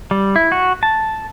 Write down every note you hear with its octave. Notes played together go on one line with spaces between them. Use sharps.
G3
E4
F#4
A5